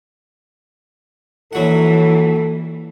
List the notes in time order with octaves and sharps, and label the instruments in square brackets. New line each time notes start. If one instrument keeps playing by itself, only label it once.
[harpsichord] A#1 F#3 F#5 [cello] E3 [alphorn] A4